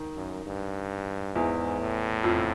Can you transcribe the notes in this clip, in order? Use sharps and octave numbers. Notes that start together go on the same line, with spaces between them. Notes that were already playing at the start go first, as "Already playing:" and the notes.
Already playing: D#3
F#2
G2
E2 G#2 E3
A2
F2 F3